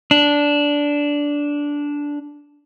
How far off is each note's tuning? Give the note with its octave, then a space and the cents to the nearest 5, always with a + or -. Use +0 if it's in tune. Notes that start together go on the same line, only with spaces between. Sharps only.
D4 -10